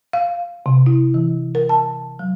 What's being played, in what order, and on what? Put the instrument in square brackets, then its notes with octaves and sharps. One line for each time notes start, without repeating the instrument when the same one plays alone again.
[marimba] F5
C3
E4
E3
A#4
A5
F#3